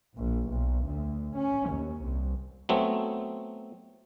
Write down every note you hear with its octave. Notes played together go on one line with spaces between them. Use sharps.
A#1
B1
D2
C#4
D#2
C2
F#3 A3 B3 C4